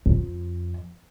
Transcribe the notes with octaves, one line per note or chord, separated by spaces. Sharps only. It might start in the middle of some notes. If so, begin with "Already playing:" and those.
F2